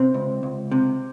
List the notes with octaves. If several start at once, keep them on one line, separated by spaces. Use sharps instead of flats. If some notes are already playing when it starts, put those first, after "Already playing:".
Already playing: C3 C4
C#2
C#2
C3